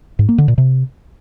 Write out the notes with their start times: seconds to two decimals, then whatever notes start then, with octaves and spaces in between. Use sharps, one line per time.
0.19 G#2
0.29 A#3
0.38 D3
0.48 A#2
0.58 C3